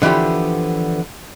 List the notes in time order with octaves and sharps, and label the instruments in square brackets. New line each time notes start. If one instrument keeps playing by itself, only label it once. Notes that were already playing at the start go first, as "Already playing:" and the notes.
[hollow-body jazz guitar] D3 E3 F3 B3 G4